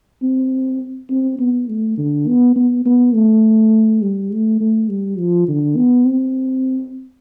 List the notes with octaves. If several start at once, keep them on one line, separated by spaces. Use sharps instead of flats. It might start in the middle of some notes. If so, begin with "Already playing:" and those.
C4
C4
B3
A3
D3
B3
B3
B3
A3
G3
A3
A3
G3
F3
D3
B3
C4